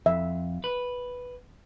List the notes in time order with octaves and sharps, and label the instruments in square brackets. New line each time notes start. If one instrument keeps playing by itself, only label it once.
[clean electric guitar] F2 [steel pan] E5
[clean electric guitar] B4